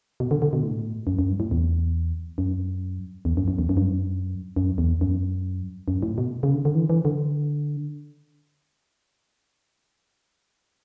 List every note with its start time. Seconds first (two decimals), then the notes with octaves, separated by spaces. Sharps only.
0.20 B2
0.31 D3
0.42 D3
0.53 B2
0.63 A2
1.07 F#2
1.19 F#2
1.28 G2
1.40 A2
1.51 E2
2.38 F#2
3.25 E2
3.37 F#2
3.48 F#2
3.59 E2
3.69 F#2
3.77 G2
3.84 F#2
4.56 F#2
4.78 E2
5.01 F#2
5.88 F#2
6.03 A2
6.18 B2
6.43 C#3
6.54 D3
6.65 D3
6.75 E3
6.90 E3
7.05 D3